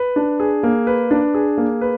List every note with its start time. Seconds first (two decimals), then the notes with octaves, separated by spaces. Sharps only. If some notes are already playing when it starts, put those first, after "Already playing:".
Already playing: B4
0.16 D4
0.40 G#4
0.63 A#3
0.87 B4
1.11 D4
1.34 G#4
1.58 A#3
1.81 B4